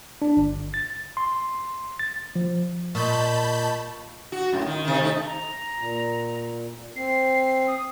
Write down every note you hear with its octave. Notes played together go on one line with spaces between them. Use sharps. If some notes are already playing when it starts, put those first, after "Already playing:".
D4
G1
A6
C6
A6
F3
A#2 D#5 A5 B5 C#6 G6
F#4
F#2 A2
D#3
C3 D#3
A3 D#4
A#5
A#2
C4 C7
D#6